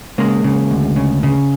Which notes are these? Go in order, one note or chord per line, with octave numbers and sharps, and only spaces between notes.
C#3 G#3 A#3
C#3
D2
C#3
C#3